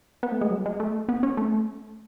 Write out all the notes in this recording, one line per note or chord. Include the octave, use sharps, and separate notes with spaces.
B3
A3
G#3
F#3
G#3
A3
B3
C#4
A3